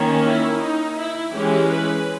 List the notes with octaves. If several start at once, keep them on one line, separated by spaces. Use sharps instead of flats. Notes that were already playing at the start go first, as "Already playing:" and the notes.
Already playing: D#3 A#3 C#4
E4
D#4
E4
E3 G#3 C#4 G4
B4